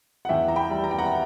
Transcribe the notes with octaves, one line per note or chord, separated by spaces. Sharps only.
F#5
E2 E5 G5
A#5
G5 B5
G3
A#5
G5
F#5 A#5